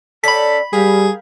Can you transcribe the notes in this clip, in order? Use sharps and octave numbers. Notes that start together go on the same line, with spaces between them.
C#4 A4 D5 G5 B5 B6
G3 G#4 A#4 F5 G5